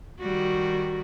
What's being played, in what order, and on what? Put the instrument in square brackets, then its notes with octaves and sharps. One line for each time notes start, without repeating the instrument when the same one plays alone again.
[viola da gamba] D#3 G3 F#4